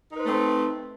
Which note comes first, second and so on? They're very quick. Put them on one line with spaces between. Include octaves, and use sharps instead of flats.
D#4 B4 C5 A3 C4